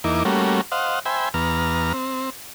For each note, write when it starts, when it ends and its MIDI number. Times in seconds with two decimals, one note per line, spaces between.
0.04 0.23 40
0.04 0.23 58
0.04 0.23 63
0.04 0.23 64
0.04 0.23 86
0.25 0.61 55
0.25 0.61 57
0.25 0.61 58
0.25 0.61 61
0.25 0.61 66
0.72 0.99 72
0.72 0.99 75
0.72 0.99 77
0.72 0.99 78
1.05 1.29 72
1.05 1.29 76
1.05 1.29 79
1.05 1.29 80
1.05 1.29 83
1.34 1.93 40
1.34 1.93 59
1.34 1.93 82
1.34 1.93 89
1.93 2.30 60